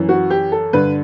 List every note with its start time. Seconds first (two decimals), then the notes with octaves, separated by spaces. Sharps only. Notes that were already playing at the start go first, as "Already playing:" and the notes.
Already playing: F#2 E3
0.09 F#4
0.30 G4
0.52 A4
0.73 G2 D3 B4